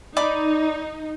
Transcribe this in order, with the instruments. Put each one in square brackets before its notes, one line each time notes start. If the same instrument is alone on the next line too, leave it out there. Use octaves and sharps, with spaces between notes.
[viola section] D#4 [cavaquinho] D5 B5 D6